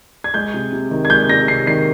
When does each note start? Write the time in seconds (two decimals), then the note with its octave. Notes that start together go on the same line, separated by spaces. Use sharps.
0.24 G#6
0.34 G#3 G6
0.54 C3
0.73 C3
0.91 D#3
1.05 G#6
1.10 G#3 G6
1.29 C3 A#6
1.48 C3 C7
1.67 D#3 C7